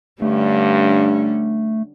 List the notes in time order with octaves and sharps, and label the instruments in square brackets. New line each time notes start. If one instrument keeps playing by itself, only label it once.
[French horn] G2 [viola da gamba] D3 G3 C#4 [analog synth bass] A3